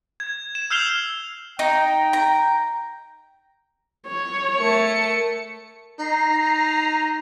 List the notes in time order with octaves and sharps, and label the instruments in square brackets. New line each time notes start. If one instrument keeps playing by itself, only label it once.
[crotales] G#6
E7
E6 F6 G6 C7 F7 G7
[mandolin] D#4 [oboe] G5
[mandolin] A#5
[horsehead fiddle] C#5
[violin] A3 C#7 [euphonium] A#4
[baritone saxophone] D#4 [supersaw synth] A#5 C7